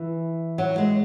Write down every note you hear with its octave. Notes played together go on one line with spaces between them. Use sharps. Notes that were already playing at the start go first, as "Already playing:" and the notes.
Already playing: E3
F#3
G#3